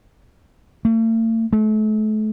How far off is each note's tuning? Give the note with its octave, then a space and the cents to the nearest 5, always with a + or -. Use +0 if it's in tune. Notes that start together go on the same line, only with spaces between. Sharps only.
A3 +45
A3 -35